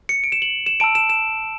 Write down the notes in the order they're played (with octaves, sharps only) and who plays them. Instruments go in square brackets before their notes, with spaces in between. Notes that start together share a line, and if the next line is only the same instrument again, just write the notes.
[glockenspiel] C#7
D7
E7
F#7
E7
A5 E6 D7
E7
E7